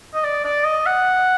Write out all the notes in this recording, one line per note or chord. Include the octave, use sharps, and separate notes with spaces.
D#5
D5
D5
D#5
F#5